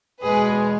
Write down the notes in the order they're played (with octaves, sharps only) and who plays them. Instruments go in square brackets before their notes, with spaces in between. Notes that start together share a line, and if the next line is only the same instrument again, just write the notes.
[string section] E2 B2 G#3 G#4 B4